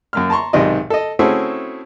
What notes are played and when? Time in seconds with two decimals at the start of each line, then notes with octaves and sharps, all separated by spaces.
0.13 F#2 A#3 F6
0.30 A5 A#5 C6 C#6
0.53 B1 G#2 C3 D#3 D5 D#5
0.90 A4 D#5
1.19 A3 C4 C#4 E4 F#4 G#4